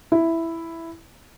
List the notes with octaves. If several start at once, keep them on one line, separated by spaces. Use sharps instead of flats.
E4